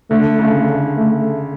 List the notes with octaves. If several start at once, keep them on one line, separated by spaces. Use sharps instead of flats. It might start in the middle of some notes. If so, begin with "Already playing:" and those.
D3 A3
C#3 A3
D3
A3